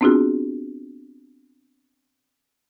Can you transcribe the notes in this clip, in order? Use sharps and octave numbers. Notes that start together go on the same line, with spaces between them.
B3 C4 D4 F4 F#4 G#4